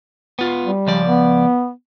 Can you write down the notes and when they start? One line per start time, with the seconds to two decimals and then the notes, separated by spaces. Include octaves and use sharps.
0.39 B3 F4
0.65 G3
0.86 C#2 F3 D5
1.05 B3